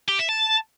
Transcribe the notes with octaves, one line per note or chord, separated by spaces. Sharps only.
G4
E5
A5